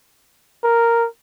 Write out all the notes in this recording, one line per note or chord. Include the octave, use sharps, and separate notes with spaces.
A#4